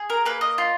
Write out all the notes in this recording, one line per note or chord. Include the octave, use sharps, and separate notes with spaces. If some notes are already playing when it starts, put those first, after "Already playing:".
Already playing: G#4
A#4
A#3 B4
D#5
F4